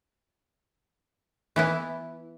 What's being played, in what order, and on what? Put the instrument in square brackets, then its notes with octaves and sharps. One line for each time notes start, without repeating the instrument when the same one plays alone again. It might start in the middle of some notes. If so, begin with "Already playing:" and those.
[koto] E3 B3 E4